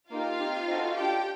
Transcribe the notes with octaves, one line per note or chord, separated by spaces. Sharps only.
A#3 D#4 F4 G4 F5
C4 D#4 G4
C4 D#4 F#4 A4
D4 F4 G4 A4 G5